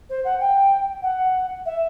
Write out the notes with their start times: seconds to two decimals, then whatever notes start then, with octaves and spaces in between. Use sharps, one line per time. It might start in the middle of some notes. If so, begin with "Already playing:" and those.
0.10 C5
0.25 F#5
0.40 G5
1.02 F#5
1.66 E5